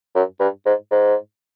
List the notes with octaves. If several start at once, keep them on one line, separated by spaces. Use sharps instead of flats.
F#2
G2
G#2
G#2